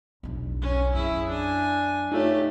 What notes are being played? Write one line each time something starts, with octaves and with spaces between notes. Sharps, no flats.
E1 B1
C#4
F#2 E4 G#4
D4 G#5
A3 D#4 F4 G4 C#5